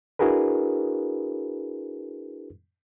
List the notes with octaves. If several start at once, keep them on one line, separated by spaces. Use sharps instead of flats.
D4 E4 F#4 G#4 A#4 B4